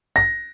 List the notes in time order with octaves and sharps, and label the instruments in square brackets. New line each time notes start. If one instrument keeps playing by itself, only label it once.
[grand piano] A#6